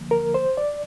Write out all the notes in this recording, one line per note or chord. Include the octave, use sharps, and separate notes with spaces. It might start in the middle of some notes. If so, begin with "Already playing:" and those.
Already playing: D2 D3 F3 A#3
A#4
C5
D5